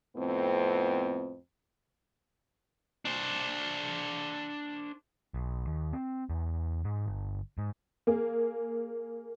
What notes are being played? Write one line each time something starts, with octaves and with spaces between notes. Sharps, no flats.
F2 A2 B3 C4
D4 C5
B1
D#2
C4
E2
G#2
G1
G#2
A#3 G#4